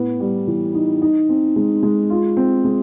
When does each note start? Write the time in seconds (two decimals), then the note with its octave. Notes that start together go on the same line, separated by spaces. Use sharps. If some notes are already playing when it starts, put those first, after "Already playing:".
Already playing: A2 B3
0.20 G3
0.47 E3
0.74 D#4
1.02 D#4
1.29 C4
1.56 G#3
1.83 G#3
2.10 F4
2.37 C4
2.64 G#3